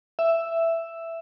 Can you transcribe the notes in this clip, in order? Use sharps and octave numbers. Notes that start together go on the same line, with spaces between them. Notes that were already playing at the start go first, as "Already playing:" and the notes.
E5